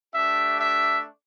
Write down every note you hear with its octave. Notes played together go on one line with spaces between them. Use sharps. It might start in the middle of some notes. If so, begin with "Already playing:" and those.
A3 D4 G4 E5
E5